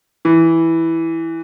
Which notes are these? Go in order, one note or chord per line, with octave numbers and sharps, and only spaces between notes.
E3